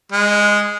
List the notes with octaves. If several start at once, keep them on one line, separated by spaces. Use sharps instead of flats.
G#3